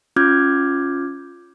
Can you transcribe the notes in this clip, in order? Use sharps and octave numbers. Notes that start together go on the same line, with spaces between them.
C#4 F4 D6 F6 G6 G#6